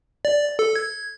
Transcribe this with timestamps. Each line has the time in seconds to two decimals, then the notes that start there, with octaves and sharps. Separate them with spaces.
0.25 D5
0.59 A4
0.76 G#6